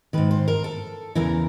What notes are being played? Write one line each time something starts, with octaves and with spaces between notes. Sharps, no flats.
G#2 D#3 B4
C5
A#4
A4
E2 C#3 E3 A#4